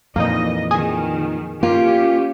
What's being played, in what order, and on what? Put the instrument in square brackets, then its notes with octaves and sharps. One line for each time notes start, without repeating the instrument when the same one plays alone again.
[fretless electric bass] F2 A#2 E3 [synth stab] A#3 D#4 [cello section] D#5
[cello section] D#3 [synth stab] G#4 D#5 G#5
[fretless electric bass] A#3 [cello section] C#4 G4 [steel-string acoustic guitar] F4